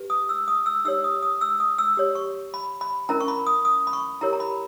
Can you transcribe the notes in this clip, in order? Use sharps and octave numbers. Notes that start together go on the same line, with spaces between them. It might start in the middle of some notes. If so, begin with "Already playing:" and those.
Already playing: G4 B4
D#6
E6
D#6
E6
D#4 G4 C#5 E6
D#6
D#6
E6
D#6
E6
G4 C#5
C#6
B5
B5
C#4 E4 A#4 A#5
C#6
B5
D#6
D#6
B5
C#6
E4 G4 A#4 C#5 A#5
A#5
B5